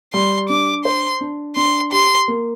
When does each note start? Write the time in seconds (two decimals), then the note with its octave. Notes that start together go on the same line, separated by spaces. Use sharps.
0.13 G3 C6
0.49 D4 D6
0.85 C5 C6
1.21 D4
1.56 D4 C6
1.92 G4 C6
2.28 A#3